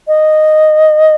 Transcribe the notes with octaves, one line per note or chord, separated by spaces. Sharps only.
D#5